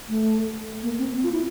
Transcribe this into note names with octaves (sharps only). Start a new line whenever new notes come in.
A3
A#3
C4
F4
E4